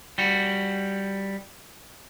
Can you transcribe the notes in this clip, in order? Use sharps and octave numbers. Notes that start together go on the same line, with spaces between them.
G3 F#4